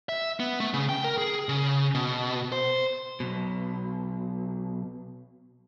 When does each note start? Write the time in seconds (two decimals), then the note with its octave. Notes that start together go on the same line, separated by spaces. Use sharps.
0.09 E5
0.40 B3
0.60 A3
0.74 C#3
0.89 G5
1.04 A#4
1.18 G#4
1.49 C#3
1.95 B2
2.52 C5
3.20 B1 B2